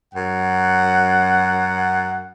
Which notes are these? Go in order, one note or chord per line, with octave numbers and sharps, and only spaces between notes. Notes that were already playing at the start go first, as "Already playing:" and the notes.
F#2 F#5